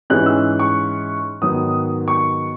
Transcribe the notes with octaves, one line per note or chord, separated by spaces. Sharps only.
G#2 E3 G#3 C#4 F#6
E6
C#6
G#2 D#3 F#3 B3 D#6
C#6